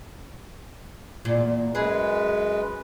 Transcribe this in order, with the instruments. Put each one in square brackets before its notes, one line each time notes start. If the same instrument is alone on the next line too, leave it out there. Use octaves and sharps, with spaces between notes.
[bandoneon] E2 [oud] A#2 F4
[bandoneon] F#2 G#3 B4 [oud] G#4